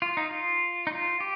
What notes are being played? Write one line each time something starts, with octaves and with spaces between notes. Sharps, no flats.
F4
D#4
F4
D#4
F4
G4